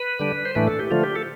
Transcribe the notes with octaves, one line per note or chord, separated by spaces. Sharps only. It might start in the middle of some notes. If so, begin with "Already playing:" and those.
Already playing: B4
D3 G3 D4
C5
A2 E3 A3 D4 B4
A4
G4
D3 F3 A3 F4
G4
A4